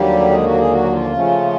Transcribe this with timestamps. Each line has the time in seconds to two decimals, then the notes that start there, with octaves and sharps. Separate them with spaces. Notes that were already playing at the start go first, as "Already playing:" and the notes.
Already playing: D#2 D3 F#3 G3 A#3 G4
0.30 G#3 G#4
0.44 F#3 F#4
0.58 G#3 G#4
0.71 F#3 F#4
0.92 F3 F4
1.13 C#3 F3 A3 C#4